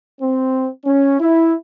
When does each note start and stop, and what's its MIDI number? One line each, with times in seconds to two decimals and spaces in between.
0.21 0.68 60
0.85 1.18 61
1.20 1.53 64